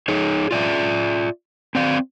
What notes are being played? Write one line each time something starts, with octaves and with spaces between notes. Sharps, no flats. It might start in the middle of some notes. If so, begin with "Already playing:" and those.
D#4 G#4 C#5
F4 D5 E5
C4 D5 F5